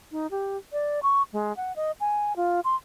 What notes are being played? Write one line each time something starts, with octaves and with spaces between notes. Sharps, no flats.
D#4
G4
D5
C#6
G#3
F#5
D#5
G#5
F4
C6